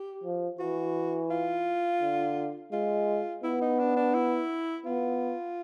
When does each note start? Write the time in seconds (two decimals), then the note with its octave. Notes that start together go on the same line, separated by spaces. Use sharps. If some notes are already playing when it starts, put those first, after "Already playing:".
Already playing: G4
0.24 F3
0.59 E3 F#4
1.30 F4
2.01 D3
2.72 G#3 F4
3.43 B3 E4
3.61 D#4
3.79 D4
3.96 D4
4.14 E4
4.86 B3 F4